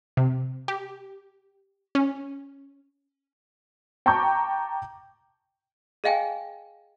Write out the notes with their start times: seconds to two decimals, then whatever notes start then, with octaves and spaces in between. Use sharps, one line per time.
0.17 C3
0.68 G4
1.95 C#4
4.06 G5 A5 A#5 C#6 D6 G6
6.04 G#4 D#5 F5 G5 G#5